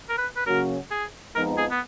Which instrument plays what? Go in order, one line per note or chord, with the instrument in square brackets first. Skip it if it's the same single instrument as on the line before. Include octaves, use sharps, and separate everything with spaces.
[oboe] A#4
B4
B4
[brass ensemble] C#3 F#3 A#3 C#4 F#4 [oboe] A#4
[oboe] G#4
[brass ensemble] F2 F3 G#3 B3 D#4 [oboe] A#4
[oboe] G#4
B3